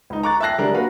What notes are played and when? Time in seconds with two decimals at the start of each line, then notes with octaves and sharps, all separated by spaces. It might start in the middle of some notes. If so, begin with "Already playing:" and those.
0.10 C#2 D#4
0.23 A#5 C#6 D6 F#6 A6
0.40 E5 G5 A5 F#6 A#6 C7
0.58 C#3 G3 G#3 D4 A#4 A#5
0.74 A#3 F#4 B4 F5